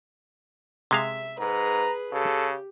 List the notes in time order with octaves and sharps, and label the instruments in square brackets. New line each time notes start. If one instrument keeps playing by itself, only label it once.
[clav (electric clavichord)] C3 G#3 F5 [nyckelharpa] E5
[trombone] G#2 [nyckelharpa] G#4 B4 [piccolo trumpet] A#5
[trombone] C#3 [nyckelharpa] G4 [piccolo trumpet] A4